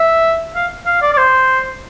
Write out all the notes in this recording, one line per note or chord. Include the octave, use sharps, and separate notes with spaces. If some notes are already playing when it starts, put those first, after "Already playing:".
Already playing: E5
F5
F5
D5
D5
C5